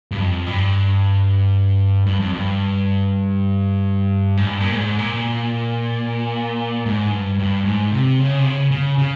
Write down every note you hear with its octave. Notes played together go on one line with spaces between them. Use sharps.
G2
F2
G2
G2
F2
G2
G#2
G2
A#2
G#2
A#2
G#2
G2
G2
G#2
C3
C#3
C3
C#3
C#3
C#3